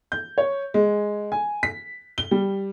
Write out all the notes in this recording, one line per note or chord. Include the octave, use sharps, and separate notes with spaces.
G6
C#5
G#3
G#5
B6
G7
G3